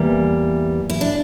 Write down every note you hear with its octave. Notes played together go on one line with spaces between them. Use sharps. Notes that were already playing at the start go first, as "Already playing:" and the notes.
Already playing: E2 E3 G3 A#3
E4
D4